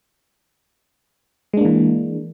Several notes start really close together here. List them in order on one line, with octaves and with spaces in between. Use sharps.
G#3 D4 A#3 E3